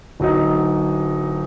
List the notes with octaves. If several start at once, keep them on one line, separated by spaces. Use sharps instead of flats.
D1 F#3 D#4